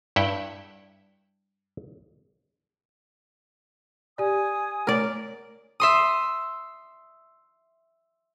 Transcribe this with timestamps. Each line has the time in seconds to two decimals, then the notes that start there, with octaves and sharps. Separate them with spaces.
0.16 G2 E4 E5 F#5 G5
4.18 G4 D5 G#5 D#6
4.87 A3 A#4 C#5 D5
5.80 E5 C6 D#6